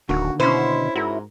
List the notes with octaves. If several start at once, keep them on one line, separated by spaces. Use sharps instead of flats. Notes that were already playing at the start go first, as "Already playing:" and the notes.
D1 D3 D#3 A#3 F#4
B2 C#4 E4 C5
G#2 E4 F#4 A#4